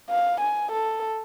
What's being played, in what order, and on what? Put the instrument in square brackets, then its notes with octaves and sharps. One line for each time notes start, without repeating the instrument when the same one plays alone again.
[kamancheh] F5
G#5
A4